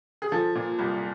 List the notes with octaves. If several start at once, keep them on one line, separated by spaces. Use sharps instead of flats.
G#4
F3 A4
A#2
C2